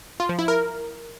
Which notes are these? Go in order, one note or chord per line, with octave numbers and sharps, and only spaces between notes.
F4
F3
E4
A#4